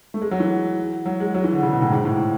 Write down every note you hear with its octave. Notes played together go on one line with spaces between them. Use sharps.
A3
G#3
F#3
E3
F#3
G#3
F#3
E3
D3
C#3
B2
A2
G#2
A2